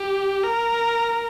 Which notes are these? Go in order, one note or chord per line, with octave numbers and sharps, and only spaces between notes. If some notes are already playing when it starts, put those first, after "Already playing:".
Already playing: G4
A#4